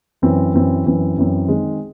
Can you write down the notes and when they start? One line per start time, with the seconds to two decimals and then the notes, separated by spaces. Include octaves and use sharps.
0.22 F#2 E3 C4
0.54 F#2 E3 C4
0.86 F#2 E3 C4
1.17 F#2 E3 C4
1.48 D#3 G#3 C4